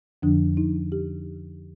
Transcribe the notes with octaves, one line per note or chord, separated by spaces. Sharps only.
F2 D3 F3 D4
D#4
G4